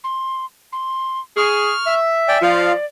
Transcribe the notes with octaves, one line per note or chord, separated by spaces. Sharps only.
C6
C6
G#4 C#6 F6
E5
D5 G5 G#5
F3 F4 D5 F5